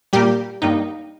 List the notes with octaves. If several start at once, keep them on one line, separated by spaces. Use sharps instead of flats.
A#2 G3 A#3 G4
G2 G3 A#3 D#4